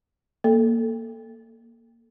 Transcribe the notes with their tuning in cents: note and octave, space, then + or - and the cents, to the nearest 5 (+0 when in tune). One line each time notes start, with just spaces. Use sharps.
A#3 +0 A4 +0